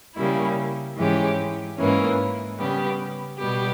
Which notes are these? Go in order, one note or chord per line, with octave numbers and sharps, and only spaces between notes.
C#3 G3 A#3 E4
G#2 E3 G#3 C#4 G4
G#2 E3 A#3 C#4
C#3 G3 B3 G4
B2 G3 B3 G4